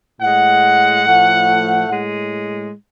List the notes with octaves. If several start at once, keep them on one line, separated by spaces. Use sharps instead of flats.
A2 G#3 F#5
A2 F3 A3
A2 G#3